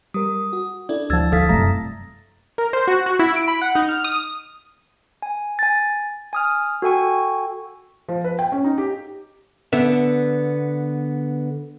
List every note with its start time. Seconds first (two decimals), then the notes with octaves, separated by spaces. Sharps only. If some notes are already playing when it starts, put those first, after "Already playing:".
0.14 G3 A#4 D#6
0.53 F#4
0.89 D4 E4 A4 D5
1.10 D2 F3 E6 G#6 A6
1.32 D#3 E4 A4 F5 D#6 A6 B6
1.49 F#2 C3 G3 A3 A#5 A#6
2.58 A#4
2.73 C5
2.88 F#4
3.06 F#4
3.19 E4
3.36 D7
3.48 B5
3.62 F#5
3.75 D#4
3.89 F6
4.04 D#6
5.22 G#5
5.59 G#5 A6
6.33 G#5 D#6 F6
6.82 F#4 A4 G5 G#5 C#6
8.09 F3
8.24 B4
8.39 G5
8.52 C#4
8.64 D#4
8.78 G4
9.73 D3 B3 E5